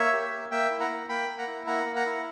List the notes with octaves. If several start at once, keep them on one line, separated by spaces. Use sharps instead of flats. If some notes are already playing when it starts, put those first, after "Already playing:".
Already playing: A#3 C#5 E5
G4
A#3
A#3 E5 G5
E4
F#5 A#5
A#3
A#3 G5 B5
A#3
F#5 A#5
E4
A#3 F#5 A#5
A#3
F#5 A#5
E4